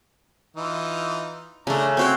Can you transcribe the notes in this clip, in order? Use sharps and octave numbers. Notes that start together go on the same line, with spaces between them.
E3 D#4 F4
C#3 A3 D4 A#5
C4 F#4 C#5 G5 C6